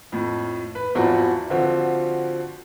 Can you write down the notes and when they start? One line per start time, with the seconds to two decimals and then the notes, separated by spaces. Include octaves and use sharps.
0.12 F2 A2
0.75 B4
0.95 G#1 E2 F3 E4 F#4
1.50 D3 F3 C4 F#4